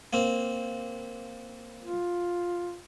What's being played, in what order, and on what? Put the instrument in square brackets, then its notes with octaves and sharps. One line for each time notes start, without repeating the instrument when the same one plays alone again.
[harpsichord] A#3 C4
[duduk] F4